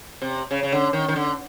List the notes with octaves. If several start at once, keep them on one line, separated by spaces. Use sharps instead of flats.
C3
C#3
C#3
D3
D#3
D#3
D3